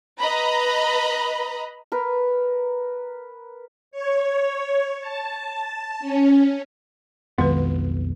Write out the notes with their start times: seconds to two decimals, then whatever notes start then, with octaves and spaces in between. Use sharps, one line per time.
0.19 B4 D#5 A#5 B5
1.92 A#4 B4
3.91 C#5
5.00 A5
6.00 C#4
7.38 B1 F2 D#3 G#3 B3 B4